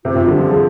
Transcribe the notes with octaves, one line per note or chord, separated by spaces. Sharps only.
C3 F4
C3
D3 G4
F3
F3 G#4